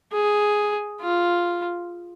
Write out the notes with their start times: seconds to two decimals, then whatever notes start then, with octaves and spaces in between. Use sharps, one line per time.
0.12 G#4
1.01 F4